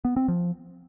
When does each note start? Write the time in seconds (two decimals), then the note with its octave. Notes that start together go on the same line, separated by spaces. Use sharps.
0.05 B3
0.16 C4
0.28 F3